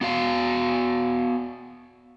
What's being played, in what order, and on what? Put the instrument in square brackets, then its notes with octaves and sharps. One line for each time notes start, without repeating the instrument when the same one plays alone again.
[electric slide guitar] B3 F#4 F5